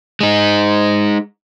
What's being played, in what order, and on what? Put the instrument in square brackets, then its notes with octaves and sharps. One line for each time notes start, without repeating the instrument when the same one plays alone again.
[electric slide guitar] G#3 D#4